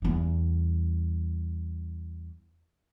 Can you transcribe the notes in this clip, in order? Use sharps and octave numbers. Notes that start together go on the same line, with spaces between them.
E2 G3